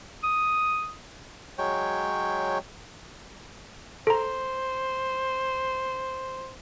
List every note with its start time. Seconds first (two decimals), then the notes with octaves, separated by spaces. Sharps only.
0.23 D#6
1.58 F#3 G#3 C#5 G5
4.07 A4 C5 A#5